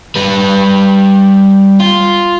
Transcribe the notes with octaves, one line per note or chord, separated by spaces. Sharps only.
G3 B4
F4